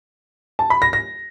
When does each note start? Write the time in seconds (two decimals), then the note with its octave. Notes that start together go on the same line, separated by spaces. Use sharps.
0.59 A5
0.70 B5
0.82 A#6
0.93 A#6